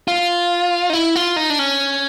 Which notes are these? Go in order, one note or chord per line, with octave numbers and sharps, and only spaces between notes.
F4
D#4
E4
F4
D#4
D4
C#4